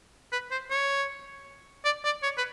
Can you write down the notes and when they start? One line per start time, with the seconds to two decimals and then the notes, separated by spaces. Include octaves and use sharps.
0.32 B4
0.51 C5
0.70 C#5
1.85 D5
2.05 D5
2.23 C#5
2.38 B4